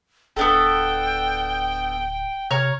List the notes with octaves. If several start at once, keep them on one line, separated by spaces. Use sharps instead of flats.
D1 B3 D4 A4 G5
C3 C#5 A#5 F6